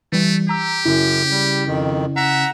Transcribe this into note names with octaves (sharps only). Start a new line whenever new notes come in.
E3 G3 A3
G4 A#5 E6
F#2 C#3 E4
G3
F2 D#3
E5 F#5 A#5